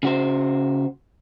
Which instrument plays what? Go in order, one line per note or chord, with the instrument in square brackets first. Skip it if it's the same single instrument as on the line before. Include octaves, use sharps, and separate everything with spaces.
[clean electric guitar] C#3 F#4 C5